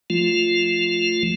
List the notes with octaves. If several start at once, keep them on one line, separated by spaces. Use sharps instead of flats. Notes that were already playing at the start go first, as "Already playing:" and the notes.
F3 A3 F4